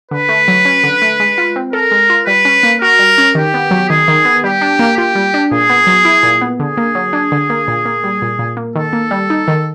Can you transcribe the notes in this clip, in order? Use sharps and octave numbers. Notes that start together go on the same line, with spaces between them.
D3 B4
A3
F#3
C#4
D3
A3
G#3
F4
C4
A4 A#4
G#3
F4
G3 B4
C#4
A#3
F#4 A#4
G3
C#4
D#3 G4
B3
F#3
D#3 G#4
D#3
B3
G3 G4
D4
A#3
F4 G4
G3
D4
A#2 G#4
B3
F#3
E4
A#2
B3
D3 G#4
A#3
F#3
D4
D3
A#3
A#2
A#3
G3
A#2
A#2
A#3
D#3 A4
A#3
G3
D#4
D#3